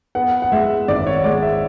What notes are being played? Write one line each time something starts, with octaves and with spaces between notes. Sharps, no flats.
B3 F#5
F#5
G#3 E5
G#1 D5
C#5
G#3 D5
E5